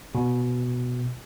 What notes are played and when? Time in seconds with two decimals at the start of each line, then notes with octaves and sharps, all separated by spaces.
0.15 B2